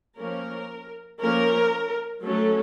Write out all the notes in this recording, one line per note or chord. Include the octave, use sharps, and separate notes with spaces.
F3 A#3 C#4 A#4
F3 A#3 C#4 A#4
F#3 A3 C#4 A4